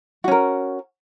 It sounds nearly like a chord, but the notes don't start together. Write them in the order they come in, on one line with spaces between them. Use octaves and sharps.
F#4 C#4 A#4